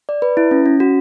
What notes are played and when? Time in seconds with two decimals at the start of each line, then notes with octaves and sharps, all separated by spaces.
0.09 D5
0.22 B4
0.37 E4
0.51 C#4
0.66 C#4
0.80 F#4